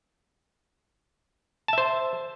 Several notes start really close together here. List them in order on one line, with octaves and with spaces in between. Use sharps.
A5 E5 C5